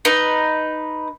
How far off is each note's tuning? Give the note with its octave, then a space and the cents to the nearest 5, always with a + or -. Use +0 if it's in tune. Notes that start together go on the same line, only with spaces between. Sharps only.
D#4 +0 B4 +0